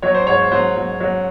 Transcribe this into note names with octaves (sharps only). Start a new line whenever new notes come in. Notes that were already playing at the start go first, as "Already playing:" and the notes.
F#3 C#5
C5
G#2 C#5
C5
F#3 C5
F#3
F#3